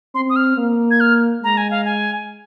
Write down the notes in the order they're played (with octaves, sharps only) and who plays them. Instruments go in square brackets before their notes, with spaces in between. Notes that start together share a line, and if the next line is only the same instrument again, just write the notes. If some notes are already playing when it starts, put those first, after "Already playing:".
[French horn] C4 [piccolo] C6
[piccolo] D#6
F6
[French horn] A#3
[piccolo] G#6
F6
[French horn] G#3 [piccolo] A#5
[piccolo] G#5
F5
G#5